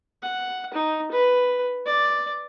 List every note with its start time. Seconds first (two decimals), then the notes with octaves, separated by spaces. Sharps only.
0.23 F#5
0.74 D#4
1.12 B4
1.86 D5